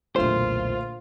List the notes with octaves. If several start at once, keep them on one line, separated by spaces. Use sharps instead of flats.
B1 E2 A#2 D3 A3 F4 C5